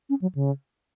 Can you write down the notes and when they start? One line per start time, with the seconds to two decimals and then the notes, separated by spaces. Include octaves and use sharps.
0.09 C#4
0.21 F#3
0.35 C#3